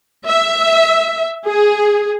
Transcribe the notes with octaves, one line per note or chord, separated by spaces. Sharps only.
E5
G#4